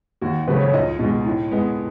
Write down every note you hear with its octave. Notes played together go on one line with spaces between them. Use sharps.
D#2 F#4
C#3 F#3 A3 B4
C#5
C#2 D#5
B2 G#3
A2
G#3 B3